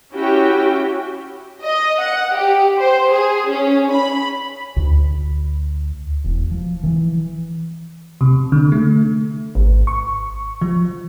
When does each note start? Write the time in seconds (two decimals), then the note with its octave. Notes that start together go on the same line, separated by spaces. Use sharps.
0.12 C#4 E4 F#4 G4 G5
1.64 D#5
2.01 F#5
2.37 G4
2.79 C5
3.10 G#4
3.49 C#4
3.93 B5
4.76 D2
6.24 E1
6.51 F3
6.83 E3
8.21 C3
8.52 D3
8.72 A3
9.55 G#1
9.87 C#6
10.62 F3